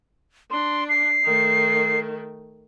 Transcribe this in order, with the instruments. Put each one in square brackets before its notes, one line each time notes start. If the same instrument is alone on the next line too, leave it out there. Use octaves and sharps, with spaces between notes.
[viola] D4 [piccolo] C6
[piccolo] C7
[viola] D#3 A3